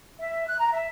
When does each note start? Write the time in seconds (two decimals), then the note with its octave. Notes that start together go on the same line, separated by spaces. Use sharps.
0.20 E5
0.47 F#6
0.59 A#5
0.72 E5